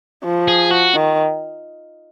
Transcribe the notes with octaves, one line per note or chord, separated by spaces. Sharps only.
F3
G#4
F#4
D#3